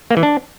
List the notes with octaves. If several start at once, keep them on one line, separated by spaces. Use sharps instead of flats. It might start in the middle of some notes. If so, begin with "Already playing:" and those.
A#3
E3
D4